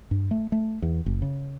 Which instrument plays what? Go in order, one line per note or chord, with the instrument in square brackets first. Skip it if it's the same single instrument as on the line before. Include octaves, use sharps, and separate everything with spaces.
[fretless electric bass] G2
A3
A3
E2
F#1
C#3